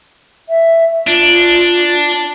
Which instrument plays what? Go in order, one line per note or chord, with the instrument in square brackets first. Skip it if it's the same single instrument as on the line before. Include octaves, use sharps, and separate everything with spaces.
[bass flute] E5
[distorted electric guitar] D4 [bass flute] F4